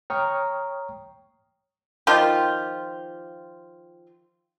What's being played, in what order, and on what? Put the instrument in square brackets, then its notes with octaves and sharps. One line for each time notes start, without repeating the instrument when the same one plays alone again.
[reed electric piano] C#5 G5 A#5 C#6 D#6 F6
[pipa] D#3 F3 F4 G4